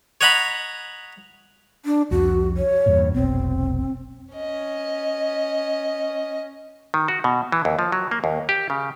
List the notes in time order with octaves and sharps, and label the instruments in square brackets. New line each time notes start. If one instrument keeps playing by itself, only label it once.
[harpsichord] C#5 D#5 F#5 A#5 B5
[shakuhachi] D4
[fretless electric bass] C2 F2 C3 [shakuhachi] F#4
[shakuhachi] C#5
[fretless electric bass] E2 G2 A#2
[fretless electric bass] F1 B1 B2 [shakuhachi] C4
[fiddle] C#4 D#5
[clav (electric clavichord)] D#3
F#4
B2
E3
D#2
F3
F#3
A#3
D#2
G4
C#3